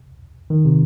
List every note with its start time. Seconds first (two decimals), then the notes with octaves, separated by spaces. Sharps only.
0.50 D#3
0.65 C3